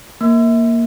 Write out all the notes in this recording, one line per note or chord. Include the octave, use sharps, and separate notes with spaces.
A#3